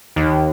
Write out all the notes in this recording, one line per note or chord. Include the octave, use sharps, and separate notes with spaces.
D#2